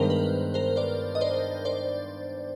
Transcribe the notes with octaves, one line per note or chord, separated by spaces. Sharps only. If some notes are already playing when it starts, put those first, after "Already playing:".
Already playing: G2 D#3 G#3 B3 D#4 A#4 C5
B4
A#4 C5
C5 D5
D#5
C5 D5
C5 D5